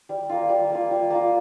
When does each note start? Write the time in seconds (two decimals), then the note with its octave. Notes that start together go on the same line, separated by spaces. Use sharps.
0.09 G3
0.29 A#3 F4
0.49 G3
0.70 A#3 F4
0.91 G3
1.10 A#3 F4